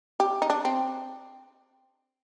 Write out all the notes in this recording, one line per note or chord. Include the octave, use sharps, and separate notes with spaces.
G4
D#4
D4
C4